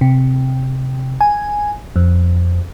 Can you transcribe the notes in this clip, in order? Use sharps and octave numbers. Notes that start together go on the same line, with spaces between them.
C3
G#5
F2